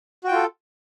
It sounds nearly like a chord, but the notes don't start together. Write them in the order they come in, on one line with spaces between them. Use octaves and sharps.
F#4 G5 F4 A4